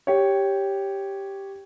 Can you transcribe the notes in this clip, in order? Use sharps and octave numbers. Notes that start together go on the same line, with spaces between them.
G4 C#5